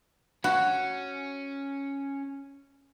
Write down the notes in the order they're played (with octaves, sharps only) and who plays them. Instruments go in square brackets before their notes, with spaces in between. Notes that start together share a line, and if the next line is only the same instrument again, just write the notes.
[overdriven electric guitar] C#4 [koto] F#4